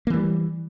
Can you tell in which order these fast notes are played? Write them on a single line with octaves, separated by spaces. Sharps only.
A#3 E3 G3